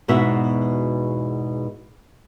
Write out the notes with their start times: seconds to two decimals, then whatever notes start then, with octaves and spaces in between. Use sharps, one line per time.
0.08 E2 G#2 B2 F#4 E5